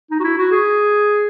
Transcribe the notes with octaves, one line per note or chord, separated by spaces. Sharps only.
D#4
F#4
E4
F#4
G#4